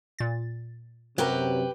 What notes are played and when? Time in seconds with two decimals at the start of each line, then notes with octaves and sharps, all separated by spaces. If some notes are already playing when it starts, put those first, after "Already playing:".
0.19 A#2 A6
1.18 F#2 C3 F#3 G4 A#4 B4 G5